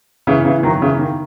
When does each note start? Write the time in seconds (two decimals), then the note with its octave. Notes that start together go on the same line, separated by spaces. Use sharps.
0.27 C#3 E3
0.45 C#3 E3
0.63 D#3 F#3
0.82 C#3 E3
0.99 D#3